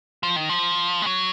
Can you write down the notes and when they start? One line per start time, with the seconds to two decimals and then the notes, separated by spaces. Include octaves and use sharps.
0.23 F3
0.36 D#3
0.49 F3
1.02 G#3
1.07 F#3